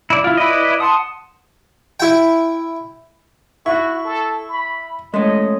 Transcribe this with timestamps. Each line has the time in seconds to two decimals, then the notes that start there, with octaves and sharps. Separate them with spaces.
0.10 E4 D5
0.24 E4 F4
0.37 E4 B4 D5 D#5 B5
0.80 F#5 A5 C6 D#6
2.00 E4 G5
3.66 E4 F#4 C#6
4.05 A4
4.50 B5
5.14 G#3 A3 C#4 D#5